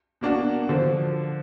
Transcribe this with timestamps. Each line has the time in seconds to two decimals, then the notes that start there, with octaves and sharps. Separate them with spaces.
0.21 B2 A#3 D4 F#4
0.69 D3 F3